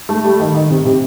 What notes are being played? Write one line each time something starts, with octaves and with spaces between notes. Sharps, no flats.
A3
G3
D#3
D#3
C3
C3